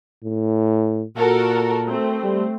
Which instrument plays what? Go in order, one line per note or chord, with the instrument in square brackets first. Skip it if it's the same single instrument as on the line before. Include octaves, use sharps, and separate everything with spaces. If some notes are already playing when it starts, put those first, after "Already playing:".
[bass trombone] A2
[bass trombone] A#2 [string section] F#4 A4 A#4
[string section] A3 C4
[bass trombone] G3